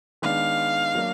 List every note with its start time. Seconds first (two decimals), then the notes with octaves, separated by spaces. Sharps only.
0.22 D#3 G#3 B3 D4 F5
0.95 F#3 A#3 D4